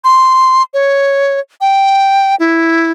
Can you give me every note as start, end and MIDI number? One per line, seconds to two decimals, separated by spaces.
0.04 0.63 84
0.74 1.40 73
1.61 2.35 79
2.40 2.92 64